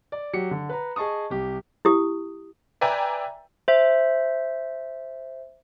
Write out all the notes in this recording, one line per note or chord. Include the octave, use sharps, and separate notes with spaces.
D5
F#3 G4 C#7
D3
B4 A#5
G#4 D#5 A5 C#6 D#6
C2 G4
E4 G4 D#6
B4 D5 E5 G5 G#5 A#5
C5 E5